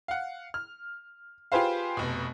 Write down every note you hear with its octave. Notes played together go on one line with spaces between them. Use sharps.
F5 F#5
F6
F4 G4 G#4 B4 C5 F5
F1 B2